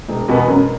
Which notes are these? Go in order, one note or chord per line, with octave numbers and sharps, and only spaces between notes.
E1
E2 B2 B3
F#2